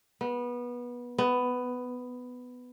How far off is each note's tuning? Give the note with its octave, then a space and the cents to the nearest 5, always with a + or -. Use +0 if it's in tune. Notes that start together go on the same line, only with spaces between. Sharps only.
B3 -20
B3 +10